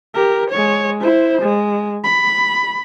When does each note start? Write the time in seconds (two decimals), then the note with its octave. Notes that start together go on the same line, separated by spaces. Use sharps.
0.14 G4 A#4
0.51 G#3 C#5
1.02 E4 C5
1.42 G#3
2.04 B5